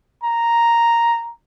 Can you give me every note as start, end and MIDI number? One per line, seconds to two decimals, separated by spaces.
0.23 1.32 82